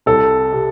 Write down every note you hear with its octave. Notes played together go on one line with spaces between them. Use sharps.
C2 A4
C3